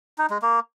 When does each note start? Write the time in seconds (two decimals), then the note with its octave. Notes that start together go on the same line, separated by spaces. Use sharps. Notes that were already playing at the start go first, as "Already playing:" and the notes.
0.18 D#4
0.30 G#3
0.42 A#3